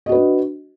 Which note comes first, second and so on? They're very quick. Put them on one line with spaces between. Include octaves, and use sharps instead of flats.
D#5 F#4 B4 D4